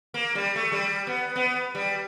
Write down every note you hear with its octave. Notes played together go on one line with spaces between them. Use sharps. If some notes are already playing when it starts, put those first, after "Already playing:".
A#3
G3
A3
G3
B3
B3
G3